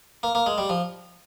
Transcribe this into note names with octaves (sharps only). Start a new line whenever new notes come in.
A#3
A#3
G#3
G3
F3